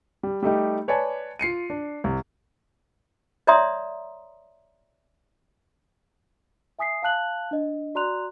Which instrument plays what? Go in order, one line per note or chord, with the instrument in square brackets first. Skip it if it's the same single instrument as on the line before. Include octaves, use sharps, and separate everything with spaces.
[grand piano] G3
G3 A3 D#4 G4
B4 C#5 D5 G#5 A5
F4 C7 C#7 D#7
D4
C2
[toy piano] C#5 D5 E5 A#5 C6 D#6
[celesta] E5 G#5 D#6 B6 C7
F5 A5 F#6 F#7
D4 D#5
F#4 D5 A#5 C6 F#6 F7